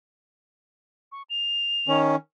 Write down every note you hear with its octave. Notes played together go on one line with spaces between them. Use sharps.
C#6
F7
D#3 C#4